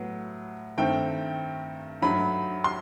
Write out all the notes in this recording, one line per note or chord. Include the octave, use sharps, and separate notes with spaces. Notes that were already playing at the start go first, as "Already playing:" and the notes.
Already playing: A2 F#3 B3
G2 D#3 A3 C4 G5
G2 F#3 A3 D#4 B5
C6